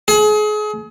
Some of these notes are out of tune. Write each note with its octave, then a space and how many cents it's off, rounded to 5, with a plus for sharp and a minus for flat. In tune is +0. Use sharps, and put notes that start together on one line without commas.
G#4 +35